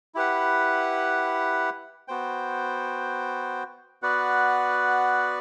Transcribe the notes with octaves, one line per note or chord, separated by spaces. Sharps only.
E4 G4 B4 F#5
B3 F#4 C5 G5
B3 F#4 B4 D5 F#5